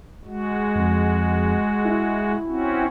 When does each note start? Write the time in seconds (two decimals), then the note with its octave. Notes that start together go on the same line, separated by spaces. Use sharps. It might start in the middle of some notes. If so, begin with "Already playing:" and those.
0.25 G#3 F#4
0.76 F2
1.85 E4
2.46 C4 C#4 F#4